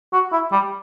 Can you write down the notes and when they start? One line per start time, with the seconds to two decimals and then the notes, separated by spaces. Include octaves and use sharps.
0.13 F#4
0.32 E4
0.52 G3